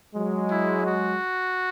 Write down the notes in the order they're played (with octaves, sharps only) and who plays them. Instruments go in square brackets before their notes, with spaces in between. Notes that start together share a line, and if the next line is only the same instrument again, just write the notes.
[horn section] F#3 G#3
[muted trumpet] E4
F#4